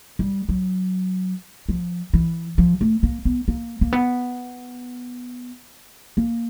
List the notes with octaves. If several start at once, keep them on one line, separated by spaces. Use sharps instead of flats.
G3
F#3
F3
E3
F3
A3
A#3
B3
A#3
A#3
B3
A#3